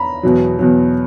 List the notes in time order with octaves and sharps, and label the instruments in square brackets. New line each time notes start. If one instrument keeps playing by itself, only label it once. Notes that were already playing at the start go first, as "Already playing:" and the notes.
Already playing: [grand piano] A#5 B5
E2 B2 F#3
E2 B2 F#3